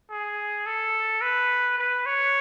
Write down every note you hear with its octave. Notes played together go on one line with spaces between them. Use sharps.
G#4
A4
B4
B4
C#5